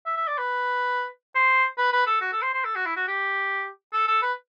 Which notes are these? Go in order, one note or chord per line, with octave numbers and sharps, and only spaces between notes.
E5
E5
D5
B4
C5
B4
B4
A4
F#4
A4
C5
C5
A4
F#4
E4
F#4
G4
A4
A4
B4